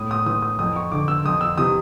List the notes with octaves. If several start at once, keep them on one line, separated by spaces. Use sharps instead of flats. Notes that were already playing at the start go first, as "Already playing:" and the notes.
Already playing: A2 D#6
D#6
E3 D#6
D#6
F2 D#6
C#6
D3 D6
E6
F2 D#6
E6
C3 E3 D#6